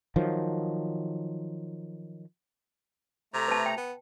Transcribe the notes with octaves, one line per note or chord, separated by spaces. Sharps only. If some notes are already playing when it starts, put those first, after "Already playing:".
D#3 F3 F#3
C3 A3 A#5
B4 A5
G5
B3